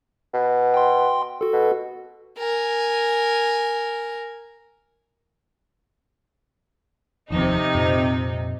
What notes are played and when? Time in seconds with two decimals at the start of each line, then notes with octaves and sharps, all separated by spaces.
0.33 B2
0.74 G5 C6
1.41 F#4 A4
1.53 B2
2.39 A#4 G#5
7.30 F1 D#2 C3 F3 D#4
7.74 F2 A#2